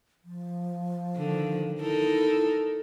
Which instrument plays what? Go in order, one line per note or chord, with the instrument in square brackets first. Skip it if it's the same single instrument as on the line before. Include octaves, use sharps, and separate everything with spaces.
[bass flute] F3
[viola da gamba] D3 D#3
[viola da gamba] D#4 A4 A#4 [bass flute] E4